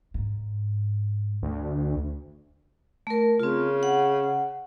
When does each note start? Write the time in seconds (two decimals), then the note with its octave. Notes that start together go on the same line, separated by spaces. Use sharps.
0.14 G#2
1.43 D2
3.07 A3 A#4
3.40 C#3 C4 F4
3.83 F#5